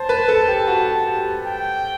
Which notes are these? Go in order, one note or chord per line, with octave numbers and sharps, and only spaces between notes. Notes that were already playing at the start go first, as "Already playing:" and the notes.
Already playing: C5 A5
B4
A4
G4
F#4
G4
G5